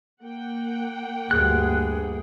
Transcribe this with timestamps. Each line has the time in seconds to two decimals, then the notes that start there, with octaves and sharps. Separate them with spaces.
0.22 A#3 F#5 G5
1.31 D2 G2 G#4 F#6